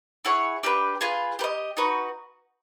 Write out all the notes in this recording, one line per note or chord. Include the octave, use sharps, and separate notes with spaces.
E4 G#4 C#5 F#5
D4 G4 B4
F4 G#4 B4
G4 B4 D#5
D#4 F#4 B4